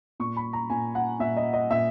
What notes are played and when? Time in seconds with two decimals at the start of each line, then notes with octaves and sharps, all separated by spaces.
0.20 A#2 C#6
0.36 B5
0.53 A#5
0.70 A#2 G#5
0.95 F#5
1.19 A#2 E5
1.37 D#5
1.53 D#5
1.70 A#2 E5